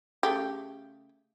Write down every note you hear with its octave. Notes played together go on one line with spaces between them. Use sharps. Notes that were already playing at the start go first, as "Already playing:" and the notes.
C#3 A3 G4